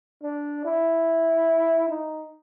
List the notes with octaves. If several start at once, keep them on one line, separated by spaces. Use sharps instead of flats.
D4
E4
D#4